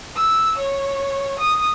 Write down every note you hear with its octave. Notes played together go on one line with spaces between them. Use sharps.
E6
C#5
D#6